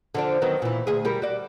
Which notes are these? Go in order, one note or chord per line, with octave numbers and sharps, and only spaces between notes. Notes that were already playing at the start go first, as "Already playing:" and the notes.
D3 F3 D4
D#3 F#3 B3
A#2 E3
D2 G#4
G3 G4 A#4
F#4 D5